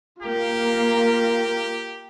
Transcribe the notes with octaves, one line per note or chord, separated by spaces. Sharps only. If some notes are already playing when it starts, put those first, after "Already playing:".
A#3 F4 G4 A#4